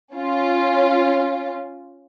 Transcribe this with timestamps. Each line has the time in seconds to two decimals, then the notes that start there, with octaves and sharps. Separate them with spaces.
0.13 C#4 F4